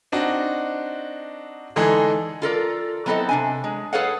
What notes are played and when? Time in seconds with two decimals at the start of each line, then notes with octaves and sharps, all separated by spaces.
0.12 C4 D4 D#4 F#4
1.76 D3 E3 G#3 D#4 G#4 A4
2.42 F4 A4 A#4 D5
3.06 F#3 B3 C4 E4 A4 D#5
3.29 C3 D4 G#5
3.64 G#3
3.93 G#4 A4 B4 C#5 F5 F#5